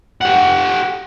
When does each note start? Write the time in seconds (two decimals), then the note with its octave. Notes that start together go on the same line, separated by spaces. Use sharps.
0.21 G4 F#5